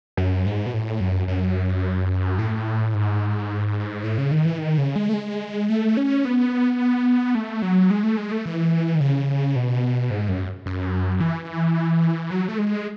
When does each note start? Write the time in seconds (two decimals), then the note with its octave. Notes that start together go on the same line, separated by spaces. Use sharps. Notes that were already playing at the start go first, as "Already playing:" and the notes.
0.17 F#2
0.46 G#2
0.66 B2
0.74 A2
1.00 F#2
1.28 F#2
2.38 A2
2.94 G#2
4.04 A2
4.18 C#3
4.31 D#3
4.45 E3
4.58 D#3
4.78 C#3
4.96 G#3
5.09 A3
5.14 G#3
5.69 A3
5.97 C#4
6.25 B3
7.35 A3
7.62 F#3
7.90 G#3
8.04 A3
8.17 G#3
8.32 A3
8.46 E3
8.95 D#3
9.00 C#3
9.56 B2
10.11 G#2
10.29 F#2
10.66 F#2
11.20 E3
12.31 F#3
12.48 A3
12.58 G#3